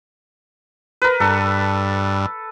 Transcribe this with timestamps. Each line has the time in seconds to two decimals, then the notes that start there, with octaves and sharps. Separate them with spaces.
1.02 A#4 B4
1.20 G2 A4